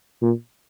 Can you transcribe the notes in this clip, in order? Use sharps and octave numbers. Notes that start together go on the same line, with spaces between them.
A#2